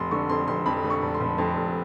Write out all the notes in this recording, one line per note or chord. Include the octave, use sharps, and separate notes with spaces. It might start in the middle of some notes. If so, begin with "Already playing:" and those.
Already playing: F1 C6
D3 C#6
F2 C6
F1 C6
F2 B5
D3
C#6
F1
C6
F1
F2 C6
F1